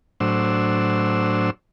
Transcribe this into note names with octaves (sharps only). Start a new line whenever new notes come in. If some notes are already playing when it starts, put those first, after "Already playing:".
A2 F#3 D4 C5 E6